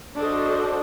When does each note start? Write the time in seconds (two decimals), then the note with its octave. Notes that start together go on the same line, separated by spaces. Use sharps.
0.17 D4 F#4 A4 C5 D#5